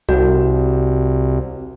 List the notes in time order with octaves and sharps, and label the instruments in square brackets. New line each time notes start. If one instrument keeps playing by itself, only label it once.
[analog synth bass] C2 [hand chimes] F#4